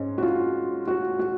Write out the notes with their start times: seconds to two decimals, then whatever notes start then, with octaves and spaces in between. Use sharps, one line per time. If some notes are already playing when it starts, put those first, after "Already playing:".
Already playing: G#2 C#4
0.18 F#4
0.23 F4
0.87 F#4
1.19 F#4